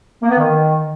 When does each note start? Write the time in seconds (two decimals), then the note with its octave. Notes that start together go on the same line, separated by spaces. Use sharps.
0.23 A#3
0.31 B3
0.39 D#3